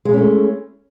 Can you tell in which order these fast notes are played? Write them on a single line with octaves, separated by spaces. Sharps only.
G#3 E4 C#4 A3